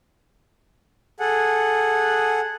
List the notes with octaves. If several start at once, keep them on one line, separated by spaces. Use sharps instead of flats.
G#4 A4 F#5